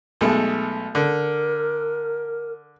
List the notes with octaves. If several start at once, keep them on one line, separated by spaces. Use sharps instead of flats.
B1 G#3 A3
D3 A#4